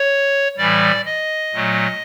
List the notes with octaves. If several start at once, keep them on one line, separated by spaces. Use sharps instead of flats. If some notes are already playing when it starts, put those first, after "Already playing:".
Already playing: C#5
A2 E3 G3 D5
D#5
A#2 F#3 A3